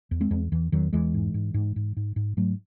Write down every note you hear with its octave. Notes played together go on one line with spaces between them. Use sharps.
E2
G#3 C4
E2
E2 E3
E2 D#3 F#3
E2 E3 G#3
G#2
G#2
G#2
G#2
G#2
G#2
G#2 F#3 A3